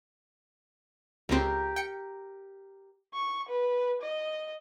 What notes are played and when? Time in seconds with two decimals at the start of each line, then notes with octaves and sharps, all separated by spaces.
1.29 C#2 C4 G4 A#4
1.76 G5 C#7
3.14 C#6
3.49 B4
4.01 D#5